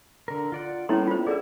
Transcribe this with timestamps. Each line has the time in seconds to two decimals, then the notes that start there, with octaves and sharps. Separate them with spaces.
0.28 D3 A#4
0.52 F4 D5 F#5
0.89 A2 G3 A#3 B3 C#4 E4 C6
1.07 F4 C5
1.27 D3 E4 G#4 A#4